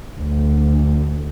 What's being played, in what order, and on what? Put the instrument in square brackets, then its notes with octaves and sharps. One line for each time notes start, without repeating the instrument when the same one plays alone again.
[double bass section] D2